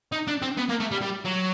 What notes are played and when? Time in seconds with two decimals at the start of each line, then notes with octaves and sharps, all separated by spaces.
0.12 D#4
0.27 D4
0.42 C4
0.57 B3
0.69 A#3
0.80 A3
0.91 G3
1.02 G3
1.25 F#3